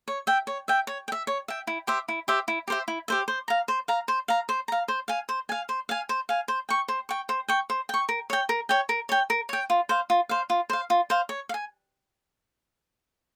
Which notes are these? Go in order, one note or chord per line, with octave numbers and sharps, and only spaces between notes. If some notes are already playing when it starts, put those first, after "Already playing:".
C#5
E5 G5
C#5
E5 G5
C#5
G5
E5
C#5
E5 G5
E4
G4 C5 E5
E4
G4 C5 E5
E4
G4 C5 E5
E4
G4 C5 E5
C5
F5 A#5
C5
F5 A#5
C5
F5 A#5
C5
F5 A#5
C5
F5 G#5
C5
F5 G#5
C5
F5 G#5
C5
F5 G#5
C5
G5 C#6
C5
G5 C#6
C5
G5 C#6
C5
G5 C#6
A#4
C#5 G5
A#4
C#5 G5
A#4
C#5 G5
A#4
C#5 G5
F4
C5 F5
F4
C5 F5
F4
C5 F5
F4
C5 F5
C#5
F5
G#5